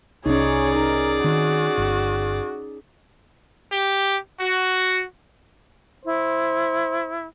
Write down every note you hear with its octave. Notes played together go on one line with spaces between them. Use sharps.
C2 C#4 D#4 G#4 C#5 D5
D#4 A#4
D#3 C4 C#4 F#4
G1
G4
F#4
E4 C5